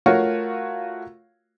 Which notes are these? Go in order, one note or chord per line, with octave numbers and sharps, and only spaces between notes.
A3 F4 F#4 A#4 C#5 F5